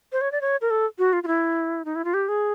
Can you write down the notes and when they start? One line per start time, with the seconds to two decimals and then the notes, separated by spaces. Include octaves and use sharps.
0.12 C5
0.21 C#5
0.32 D5
0.41 C#5
0.61 A#4
0.70 A4
0.99 F#4
1.13 F4
1.23 F4
1.27 E4
1.85 D#4
1.96 E4
2.05 F4
2.14 G4
2.28 G#4